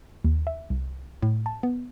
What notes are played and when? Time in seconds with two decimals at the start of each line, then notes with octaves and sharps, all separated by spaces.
0.24 D#2
0.47 E5
0.70 C2
1.22 A2
1.46 A5
1.63 B3